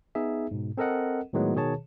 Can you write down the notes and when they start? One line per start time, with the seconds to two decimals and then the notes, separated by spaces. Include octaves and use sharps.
0.15 B3 D#4 G#4 E5
0.51 G#2 B2
0.77 C4 A4 A#4 D#5 F#5
1.33 A2 D#3 F#3 G#3 B3
1.55 B2 D#3 G#4 C#5 A5